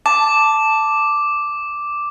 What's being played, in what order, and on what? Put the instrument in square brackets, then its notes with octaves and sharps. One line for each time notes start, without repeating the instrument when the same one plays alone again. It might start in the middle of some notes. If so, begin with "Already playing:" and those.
[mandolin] A5 [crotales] D6